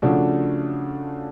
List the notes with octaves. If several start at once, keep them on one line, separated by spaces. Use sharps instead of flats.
C#3 F3 A3 D4 F#4